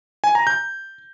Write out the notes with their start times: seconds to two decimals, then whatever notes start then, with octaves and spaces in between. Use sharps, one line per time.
0.24 G#5
0.35 A#5
0.47 G6